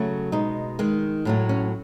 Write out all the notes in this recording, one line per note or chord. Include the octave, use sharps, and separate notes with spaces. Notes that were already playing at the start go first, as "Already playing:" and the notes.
Already playing: C#3 F#3 A3
B2 G#3 D#4
D#3 G#3
A2 F#3 A3
C#4